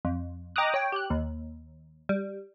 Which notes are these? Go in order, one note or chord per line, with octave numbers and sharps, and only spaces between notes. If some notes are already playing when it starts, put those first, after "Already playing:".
F2
D#5 G5 A#5 D6 D#6 F#6
C#5 G5
G4 F#6
D#2
G3